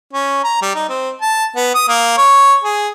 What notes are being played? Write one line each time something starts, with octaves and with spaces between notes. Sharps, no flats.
C#4
A#5
G3
D#4
C4
A5
B3
D#6
A#3
C#5
G#4